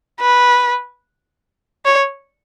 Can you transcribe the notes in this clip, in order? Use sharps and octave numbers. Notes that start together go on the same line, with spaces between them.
B4
C#5